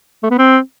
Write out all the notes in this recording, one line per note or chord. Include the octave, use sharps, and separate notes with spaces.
A3
B3
C4